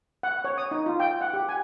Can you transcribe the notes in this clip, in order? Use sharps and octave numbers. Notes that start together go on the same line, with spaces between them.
F#5
C#5
D#6
D#4
F4
G5
F#5
G4
G#5